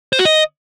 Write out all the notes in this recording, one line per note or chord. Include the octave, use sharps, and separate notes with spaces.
C5
F#4
D#5